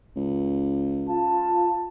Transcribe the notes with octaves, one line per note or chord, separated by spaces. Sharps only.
C#2
F4 A5